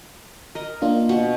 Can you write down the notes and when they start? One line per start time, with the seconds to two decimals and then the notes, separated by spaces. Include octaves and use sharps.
0.55 A#4 D#5
0.82 A#3 D4 F4
1.09 B2 B3 F#4